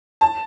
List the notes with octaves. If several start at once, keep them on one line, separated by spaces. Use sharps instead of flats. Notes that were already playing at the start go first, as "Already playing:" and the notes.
A5